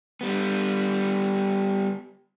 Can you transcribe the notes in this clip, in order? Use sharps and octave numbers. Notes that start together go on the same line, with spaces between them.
G3 B3